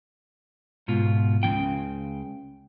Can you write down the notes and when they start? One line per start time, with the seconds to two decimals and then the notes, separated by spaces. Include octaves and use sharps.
0.88 G#2 B2 F4
1.43 C#2 C#3 F3 A#3 G5